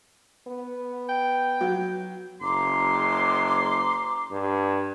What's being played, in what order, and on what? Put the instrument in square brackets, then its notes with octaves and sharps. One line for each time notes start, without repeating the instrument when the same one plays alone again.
[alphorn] B3
[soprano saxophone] G5
[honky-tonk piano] F#3
[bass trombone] F#1 [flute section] A#5 D6 [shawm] C6
[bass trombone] G2